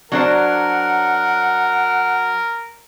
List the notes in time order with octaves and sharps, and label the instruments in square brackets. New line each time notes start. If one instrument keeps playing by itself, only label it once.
[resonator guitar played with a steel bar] F#3 D4 C5 [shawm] A#4 [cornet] F#5